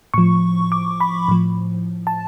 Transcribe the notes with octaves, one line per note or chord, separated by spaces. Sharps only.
A2 F3 C#6
D6
B5
A2 F3
A5